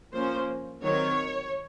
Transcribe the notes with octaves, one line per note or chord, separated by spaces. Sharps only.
F3 A#3 C#4 C5
D#3 F#3 C4 C#5